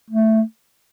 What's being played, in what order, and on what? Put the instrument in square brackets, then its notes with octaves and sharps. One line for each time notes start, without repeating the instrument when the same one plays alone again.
[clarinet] A3